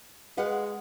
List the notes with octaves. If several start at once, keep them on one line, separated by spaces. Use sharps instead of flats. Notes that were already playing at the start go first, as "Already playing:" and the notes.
G#3 B4 F5 F#5